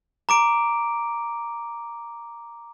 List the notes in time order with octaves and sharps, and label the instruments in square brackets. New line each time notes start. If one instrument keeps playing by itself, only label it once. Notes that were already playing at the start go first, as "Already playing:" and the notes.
[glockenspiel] A#5 D6 D7